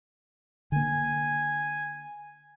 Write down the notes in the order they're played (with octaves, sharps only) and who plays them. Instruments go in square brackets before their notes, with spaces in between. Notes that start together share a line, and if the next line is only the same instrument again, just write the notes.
[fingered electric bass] D3 A#3 [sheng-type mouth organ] G#5